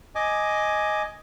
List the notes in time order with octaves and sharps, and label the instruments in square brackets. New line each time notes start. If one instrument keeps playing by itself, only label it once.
[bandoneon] D#5 G#5 D6